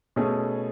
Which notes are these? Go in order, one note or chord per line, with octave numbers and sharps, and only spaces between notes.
B2 A3 C#4 G#4